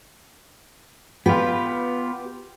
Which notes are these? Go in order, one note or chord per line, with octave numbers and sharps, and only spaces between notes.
B3 F4 G4 B4